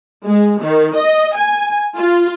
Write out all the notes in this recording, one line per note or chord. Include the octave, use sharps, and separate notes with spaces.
G#3
D#3
D#5
G#5
F4